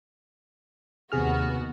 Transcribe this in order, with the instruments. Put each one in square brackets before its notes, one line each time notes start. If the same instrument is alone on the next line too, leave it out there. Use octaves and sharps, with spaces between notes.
[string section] D#2 B3 F#4 [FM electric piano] C3 G#4 F6